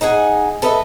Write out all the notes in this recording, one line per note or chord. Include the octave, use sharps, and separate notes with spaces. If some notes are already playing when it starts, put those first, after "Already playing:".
D#4 G#4 F#5 G#5
A4 B4 D#5 E5